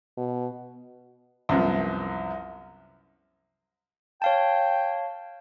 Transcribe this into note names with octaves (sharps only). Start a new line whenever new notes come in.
B2
C2 F#2 F3 B3
C#5 F5 G5 A5